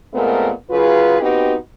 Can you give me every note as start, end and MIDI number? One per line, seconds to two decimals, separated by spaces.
0.13 0.51 46
0.13 0.51 56
0.13 0.51 57
0.13 0.51 59
0.13 0.51 60
0.13 0.51 70
0.70 1.20 49
0.70 1.20 54
0.70 1.20 65
0.70 1.20 68
0.70 1.20 71
1.20 1.55 59
1.20 1.55 60
1.20 1.55 63
1.20 1.55 66
1.20 1.55 67
1.20 1.55 71